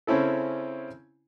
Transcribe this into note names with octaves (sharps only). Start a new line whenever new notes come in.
C#3 C4 C#4 E4 A4